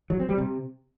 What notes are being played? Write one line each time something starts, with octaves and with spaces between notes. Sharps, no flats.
F#3
C4
G3
C3